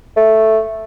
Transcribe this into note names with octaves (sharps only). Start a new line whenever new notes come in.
A3